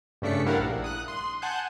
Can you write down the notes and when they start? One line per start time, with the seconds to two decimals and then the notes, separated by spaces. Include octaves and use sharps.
0.22 G2 C#3 A3 D4 B6 C#7
0.46 G3 D4 E4 A#4 F5 F#5
0.57 A#1
0.84 D#6 F#6
1.08 C6
1.42 F#5 G#5 A5 F#6 G6